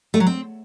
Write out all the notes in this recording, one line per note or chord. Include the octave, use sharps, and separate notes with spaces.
A3
F#3
C4